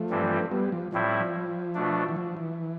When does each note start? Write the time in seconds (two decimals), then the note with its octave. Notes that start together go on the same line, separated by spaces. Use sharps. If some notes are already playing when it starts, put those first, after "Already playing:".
Already playing: F3 A3
0.10 G2 E3 G3 C4
0.51 G3 B3
0.72 F3
0.92 A2 F3 G3 C4 E4
1.20 F3
1.75 B2 A3 D4
2.09 E3
2.16 F3
2.37 E3